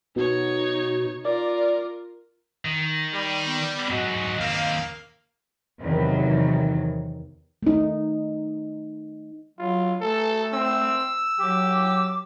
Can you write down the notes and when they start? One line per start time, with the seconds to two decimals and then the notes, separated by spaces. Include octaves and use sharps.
0.16 B2 D#4 C#5
1.25 F4 A#4 D5
2.65 D#3
3.12 G3
3.46 B3
3.90 G#2 F#3 F#4 D#5
4.38 D#2 A#3 C4 F5
5.82 E2 C3 D#3 F#3
7.63 A3 D#4
9.59 F#3 F4
10.01 A3 A4
10.53 C4 E6
11.39 F#3 G4 D6